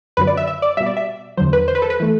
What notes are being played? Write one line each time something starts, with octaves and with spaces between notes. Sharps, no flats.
F#2 D3 F#3 B4
D5
E5
E5
D5
B2 G3 E5
D5
E5
E2 D3 F#3 C5
B4
C5
B4
A4
B4
E3 A3